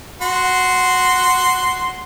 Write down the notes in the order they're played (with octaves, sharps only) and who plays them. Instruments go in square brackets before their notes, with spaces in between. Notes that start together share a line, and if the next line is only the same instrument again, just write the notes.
[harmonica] F#4 C6